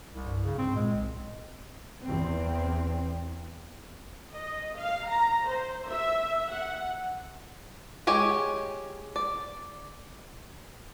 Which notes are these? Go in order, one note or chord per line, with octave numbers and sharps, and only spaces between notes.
C2
G2
C#3
G#2 C4
A#2 G#3
B1
E2 C4
D#5
F5
A#5
C5
E5
F#5
G#3 G4 C#5 G#5
D5